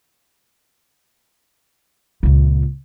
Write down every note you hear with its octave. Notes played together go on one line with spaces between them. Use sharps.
C#2 A#2